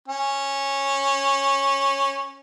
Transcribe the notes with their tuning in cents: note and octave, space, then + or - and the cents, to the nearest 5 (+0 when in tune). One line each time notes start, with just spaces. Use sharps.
C#4 -10